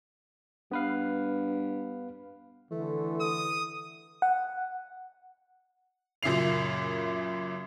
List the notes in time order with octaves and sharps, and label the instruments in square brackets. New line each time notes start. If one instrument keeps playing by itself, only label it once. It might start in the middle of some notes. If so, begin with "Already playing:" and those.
[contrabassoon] G2 [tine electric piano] B3 B4 F5
[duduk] D3 [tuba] E3 [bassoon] A3
[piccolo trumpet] D#6
[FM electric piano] F#5
[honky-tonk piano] F#2 A#2 C#3 E5 C7 F7